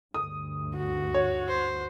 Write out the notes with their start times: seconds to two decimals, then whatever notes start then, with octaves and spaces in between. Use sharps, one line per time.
0.14 D2 G2 D#6
0.77 F#4
1.14 C#5
1.48 C5